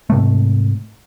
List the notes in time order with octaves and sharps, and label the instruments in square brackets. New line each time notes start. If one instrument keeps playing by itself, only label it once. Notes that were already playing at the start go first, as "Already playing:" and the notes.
[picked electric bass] G#2 C3 A3